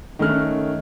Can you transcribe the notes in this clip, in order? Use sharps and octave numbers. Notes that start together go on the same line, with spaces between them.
D#3 A3 C#4 F6 F#6